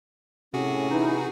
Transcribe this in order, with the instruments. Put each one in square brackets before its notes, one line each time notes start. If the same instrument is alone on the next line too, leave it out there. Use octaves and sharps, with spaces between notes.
[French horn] A2 [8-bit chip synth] C3 F#4 G#4 [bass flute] C#4
[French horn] E3 [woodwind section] D#4